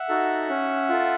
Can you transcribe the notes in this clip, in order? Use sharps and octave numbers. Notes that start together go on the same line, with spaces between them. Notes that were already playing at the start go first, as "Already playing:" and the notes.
Already playing: E5 F#5
D#4 F#4 A4
C#4
F4 A4